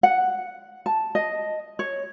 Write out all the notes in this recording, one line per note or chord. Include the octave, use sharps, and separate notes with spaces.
F#5
A5
D#5
C#5